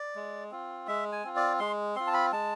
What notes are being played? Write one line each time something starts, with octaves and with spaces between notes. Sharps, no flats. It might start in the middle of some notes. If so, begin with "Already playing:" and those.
Already playing: D5
G#3
C4 F4
G#3 E5
G#5
C4 F4
D5
G#3 C6
C4 F4 C6
A5
B5
G#3 A5